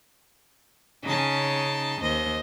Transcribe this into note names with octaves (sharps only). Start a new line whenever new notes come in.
C#3 C#4 D#4 A5
D#2 C5 D#5